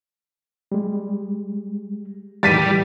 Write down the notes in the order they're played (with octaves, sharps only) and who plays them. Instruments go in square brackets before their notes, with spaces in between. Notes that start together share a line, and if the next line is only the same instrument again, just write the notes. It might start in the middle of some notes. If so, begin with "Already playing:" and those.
[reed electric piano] G3 G#3
[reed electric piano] A2 D#3 E3 [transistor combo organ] G3 [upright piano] A6 B6 D#7